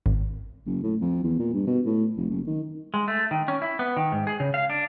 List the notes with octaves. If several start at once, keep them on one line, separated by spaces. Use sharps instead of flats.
G#1
F#1
A2
F2
E2
A#2
G2
B2
A2
F1
F#1
D#3
G#3
A3
D#3
C#4
E4
B3
D#3
G#2
G#4
C#3
F5
D4